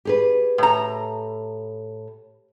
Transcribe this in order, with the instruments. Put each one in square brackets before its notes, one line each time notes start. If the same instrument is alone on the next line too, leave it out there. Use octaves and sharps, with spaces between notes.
[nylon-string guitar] G4 G#4 B4
[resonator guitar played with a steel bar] A2 A#5